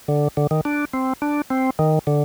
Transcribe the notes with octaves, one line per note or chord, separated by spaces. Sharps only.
D3
D3
D#3
D4
C4
D4
C4
D#3
D3